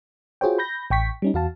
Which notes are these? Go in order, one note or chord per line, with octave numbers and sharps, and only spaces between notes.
F4 F#4 G#4 C5 C#5 G5
B5 G6 A#6
A1 G5 C#6 B6
G3 C#4 D#4
E2 F#4 F5 A5